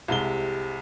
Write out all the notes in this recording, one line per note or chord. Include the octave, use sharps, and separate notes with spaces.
C2 C3 G#3 G7